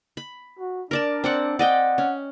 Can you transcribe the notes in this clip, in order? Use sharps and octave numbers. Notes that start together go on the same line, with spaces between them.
B5
F#4
D4 A#4 D5 A5
C4 D5 F#5
D5 D#5 F#5 G5
C#4